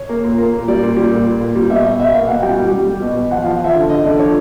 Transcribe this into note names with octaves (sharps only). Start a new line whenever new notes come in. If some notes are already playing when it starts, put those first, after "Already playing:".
Already playing: C#5
A#3
A#2
A#3
A#2
G3 D5
A#2
G3
A#2
A#2
A#2
G3
B2 E5
B2 D#5
B2 E5
A#3 F5
B2 F#5
G3 G5
G3
G3
G3
B2
B2
F3 F#5
F3 F5
F3 E5
D3
D3 D#5
D3 D5
F3 C#5